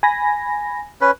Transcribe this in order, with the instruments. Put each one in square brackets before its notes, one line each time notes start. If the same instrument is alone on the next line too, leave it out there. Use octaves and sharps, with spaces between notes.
[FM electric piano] G#5 B5 A#6
[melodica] C#4 B4